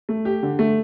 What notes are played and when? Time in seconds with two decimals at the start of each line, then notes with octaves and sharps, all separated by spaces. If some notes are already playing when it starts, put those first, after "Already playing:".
0.09 A3
0.25 G4
0.43 D3
0.59 A3